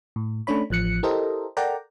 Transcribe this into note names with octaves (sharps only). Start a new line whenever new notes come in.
A2
A3 C#4 D4 C#5 B5
A1 F3 F#6 C#7
E4 G4 A4 A#4 C5 D#5
A4 A#4 D5 F#5 G5 A#5